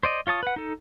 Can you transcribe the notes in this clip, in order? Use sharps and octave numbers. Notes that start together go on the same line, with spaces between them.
C5 D5 D#5
F4 C#5 A5 D#6
B4 F#5
D#4 A4